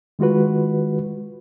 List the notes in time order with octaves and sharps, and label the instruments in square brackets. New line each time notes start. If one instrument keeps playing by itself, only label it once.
[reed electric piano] D#3 G#3 F4 F#4 B4